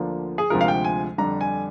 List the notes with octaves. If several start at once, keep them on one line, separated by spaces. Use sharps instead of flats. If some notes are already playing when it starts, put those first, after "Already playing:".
Already playing: D2 D3 F3 A#3 D4
G#4
D2 C3 F3 G#3 A#4
F5
G5
G#5
F2 D3 G3 D4 A#5
G#5